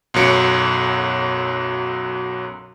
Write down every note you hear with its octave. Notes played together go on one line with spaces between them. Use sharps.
B1 F#2 F#3 C#7 D7